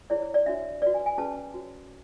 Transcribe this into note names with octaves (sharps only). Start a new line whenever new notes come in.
E4 G#4 C#5 D5
C#5
D5
D4 F#4 C#5 E5
F#4 B4 D5
G#5
G#5
C#4 G#4 B4 A5
F#4 C#5